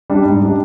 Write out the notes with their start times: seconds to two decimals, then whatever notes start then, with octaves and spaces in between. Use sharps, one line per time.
0.10 G3 D4
0.25 G#2
0.42 G3 D4